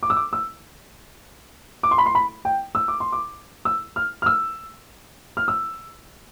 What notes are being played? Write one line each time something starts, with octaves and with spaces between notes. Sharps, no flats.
D6
E6
D6
E6
D6
C6
B5
C6
B5
G5
E6
D6
C6
D6
E6
F6
F6
E6
F6
E6